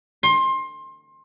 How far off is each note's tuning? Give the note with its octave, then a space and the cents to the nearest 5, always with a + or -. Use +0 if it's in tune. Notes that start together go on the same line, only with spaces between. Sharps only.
C6 +25